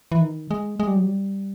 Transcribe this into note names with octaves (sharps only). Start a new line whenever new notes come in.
E3
D#3
G#3
G#3
G3
F#3
G3